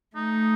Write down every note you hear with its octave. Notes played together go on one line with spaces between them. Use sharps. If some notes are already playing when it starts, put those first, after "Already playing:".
A3 D#4